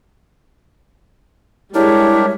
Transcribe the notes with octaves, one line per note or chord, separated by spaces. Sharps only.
G3 G#3 D4 E4 G4 A#4 C#5 E5